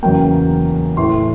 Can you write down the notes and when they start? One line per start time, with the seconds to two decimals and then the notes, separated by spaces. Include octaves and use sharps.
0.02 E2 C#3 F#3 A#3 G5
0.97 A2 E3 A3 C6